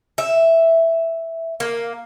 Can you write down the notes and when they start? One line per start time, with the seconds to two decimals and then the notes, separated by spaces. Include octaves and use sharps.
0.18 E5
1.60 A#3